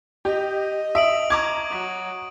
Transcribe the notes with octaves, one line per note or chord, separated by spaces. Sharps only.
G4 D#5
E5 D#6 D7 F#7
A#5 C#6 D6 G#6
F#3